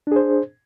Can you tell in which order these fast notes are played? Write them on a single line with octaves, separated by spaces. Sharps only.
D4 G#4 C5